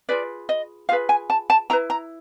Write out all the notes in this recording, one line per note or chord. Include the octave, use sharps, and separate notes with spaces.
F4 G#4 B4 D5
D#5
F4 G#4 B4 F5
G#5
A5
A5
E4 G#4 B4 A#5
A#5